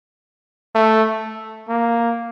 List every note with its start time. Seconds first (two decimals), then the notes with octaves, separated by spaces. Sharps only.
0.75 A3
1.69 A#3